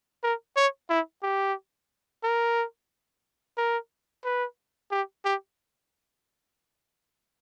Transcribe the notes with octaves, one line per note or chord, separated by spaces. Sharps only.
A#4
C#5
E4
G4
A#4
A#4
B4
G4
G4